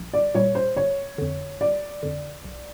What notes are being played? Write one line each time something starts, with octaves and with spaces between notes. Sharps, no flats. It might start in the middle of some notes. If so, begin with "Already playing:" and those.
Already playing: A#1
D5
A#2 G3 C#5
C5
G1 C#5
F2 D3
G1 D5
F2 D3
B1